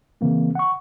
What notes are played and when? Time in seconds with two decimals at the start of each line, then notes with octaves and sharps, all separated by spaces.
0.21 C#3 E3 A#3 C4
0.55 F#5 C#6